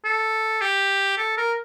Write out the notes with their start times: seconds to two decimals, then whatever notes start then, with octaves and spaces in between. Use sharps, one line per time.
0.05 A4
0.62 G4
1.18 A4
1.37 A#4